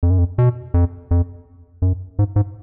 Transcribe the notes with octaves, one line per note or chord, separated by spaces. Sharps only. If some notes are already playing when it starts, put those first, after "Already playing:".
F2
F#2
F2
B2
F2
F2
F#2
G#2
G#2